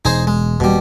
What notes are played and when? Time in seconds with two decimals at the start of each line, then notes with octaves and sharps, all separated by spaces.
0.05 E1 D#4 G#4 C5
0.27 G#3
0.60 D#1 B2 G3